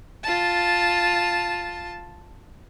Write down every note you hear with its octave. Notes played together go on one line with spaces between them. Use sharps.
F4 A5